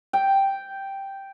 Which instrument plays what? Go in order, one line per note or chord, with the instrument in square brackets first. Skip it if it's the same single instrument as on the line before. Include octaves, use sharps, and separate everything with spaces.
[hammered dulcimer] G5